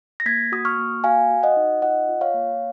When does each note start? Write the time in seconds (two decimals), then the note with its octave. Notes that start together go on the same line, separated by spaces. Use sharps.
0.20 A#6
0.26 A#3 G#6 B6
0.52 F#4 D#6
0.65 C#6 F6
0.78 A#3
1.04 F#4 F5 G#5
1.30 F#4
1.43 D#5 F#5
1.56 D#4
1.82 F4 D#5 F#5
2.09 F4
2.21 C#5 F5
2.34 A#3